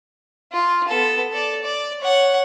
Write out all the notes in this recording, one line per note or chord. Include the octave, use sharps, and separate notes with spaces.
F4
B3 A4
A4 D5
D5
C#5 F#5